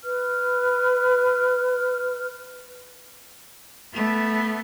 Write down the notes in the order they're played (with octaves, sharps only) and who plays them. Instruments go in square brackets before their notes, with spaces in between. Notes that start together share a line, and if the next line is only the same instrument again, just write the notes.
[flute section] B4 F6
[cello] A3 B3